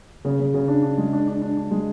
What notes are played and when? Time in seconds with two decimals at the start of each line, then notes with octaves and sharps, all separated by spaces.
0.25 C#3
0.39 C#3
0.54 C#3
0.68 D4
0.83 D4
0.98 G#3
1.13 D4
1.28 D4
1.42 D4
1.57 D4
1.71 G#3